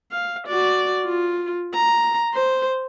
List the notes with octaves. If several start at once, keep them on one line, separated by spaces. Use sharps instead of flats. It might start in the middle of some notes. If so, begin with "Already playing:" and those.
F5
F#4 D5
F4
A#5
C5